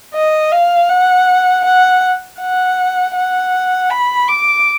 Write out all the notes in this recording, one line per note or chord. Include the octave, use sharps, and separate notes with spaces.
D#5
F5
F#5
F#5
F#5
F#5
B5
D6